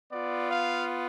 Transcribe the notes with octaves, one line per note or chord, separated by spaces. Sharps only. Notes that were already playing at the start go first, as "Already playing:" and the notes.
B3 F4 D5
F5